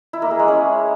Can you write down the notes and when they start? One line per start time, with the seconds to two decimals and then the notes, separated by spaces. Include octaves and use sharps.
0.13 E4
0.22 A#3
0.31 G#4
0.39 G#3
0.48 C#4